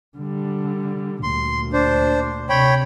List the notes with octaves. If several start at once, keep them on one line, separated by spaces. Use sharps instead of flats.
D3 G3
D2 A#2 C6
D4 C5
C3 C#5 G5 B5